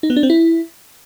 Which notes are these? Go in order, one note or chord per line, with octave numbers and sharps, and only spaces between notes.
D#4
B3
D4
C4
E4